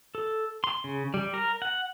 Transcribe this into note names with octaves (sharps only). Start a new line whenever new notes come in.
A4
C6
C#3
G3
A#4
F#5